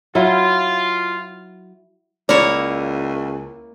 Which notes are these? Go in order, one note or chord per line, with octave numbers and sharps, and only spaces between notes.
F#3 E4 F4
C#2 A#3 E4 C#5 D5